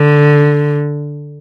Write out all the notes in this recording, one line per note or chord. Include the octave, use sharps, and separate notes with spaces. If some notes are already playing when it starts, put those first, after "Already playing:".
Already playing: D3